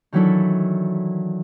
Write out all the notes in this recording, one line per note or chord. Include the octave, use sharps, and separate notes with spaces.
D#3 E3 F#3 D4 E4 A4